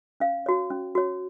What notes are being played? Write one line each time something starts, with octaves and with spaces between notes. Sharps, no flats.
C#4 F5
F#4 C#5
C#4
F#4 C#5